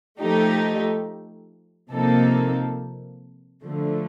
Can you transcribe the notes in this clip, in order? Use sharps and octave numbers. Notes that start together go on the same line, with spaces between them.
F3 A3 D#4 G4
C3 F3 A#3 D#4 A4
D3 F3 A3